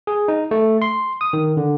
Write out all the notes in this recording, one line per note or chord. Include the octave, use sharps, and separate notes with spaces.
G#4
D#4
A3
C6
D#6
D#3
D3